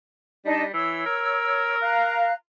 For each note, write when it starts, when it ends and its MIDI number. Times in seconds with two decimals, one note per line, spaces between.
0.45 0.70 55
0.45 0.63 62
0.45 0.63 63
0.45 0.63 75
0.74 1.03 52
0.74 1.75 73
0.74 1.75 88
1.06 2.26 70
1.81 2.31 77
1.81 2.31 82
1.81 2.31 90